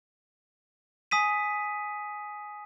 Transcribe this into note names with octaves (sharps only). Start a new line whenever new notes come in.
G#5 D#6 B6 D#7